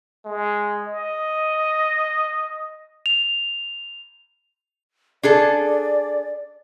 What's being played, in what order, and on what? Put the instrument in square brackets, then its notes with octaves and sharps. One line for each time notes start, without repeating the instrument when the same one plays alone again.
[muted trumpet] G#3
D#5
[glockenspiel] F7
[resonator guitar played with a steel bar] D4 G#4 A4 [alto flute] D5